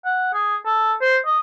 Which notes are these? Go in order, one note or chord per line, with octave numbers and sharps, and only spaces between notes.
F#5
G#4
A4
C5
D#5